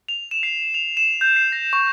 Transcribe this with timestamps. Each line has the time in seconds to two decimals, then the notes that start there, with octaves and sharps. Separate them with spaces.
0.08 F7
0.31 E7
0.43 C7
0.74 F7
0.97 E7
1.21 G6
1.36 C7
1.52 A#6
1.73 C#6